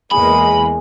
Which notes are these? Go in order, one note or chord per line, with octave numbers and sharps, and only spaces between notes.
E2 G#3 A#3 G#4 B5